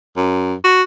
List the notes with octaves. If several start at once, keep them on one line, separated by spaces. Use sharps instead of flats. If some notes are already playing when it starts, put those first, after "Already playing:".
F#2
F#4